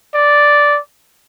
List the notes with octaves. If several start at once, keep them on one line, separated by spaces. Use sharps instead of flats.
D5